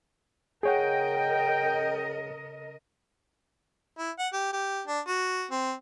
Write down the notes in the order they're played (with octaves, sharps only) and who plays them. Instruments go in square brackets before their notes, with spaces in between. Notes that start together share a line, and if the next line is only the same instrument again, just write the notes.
[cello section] C#3 A#4 D#5 [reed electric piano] G#4 C#5 F#5 [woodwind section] G5
[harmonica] E4
F#5
G4
G4
D4
F#4
C4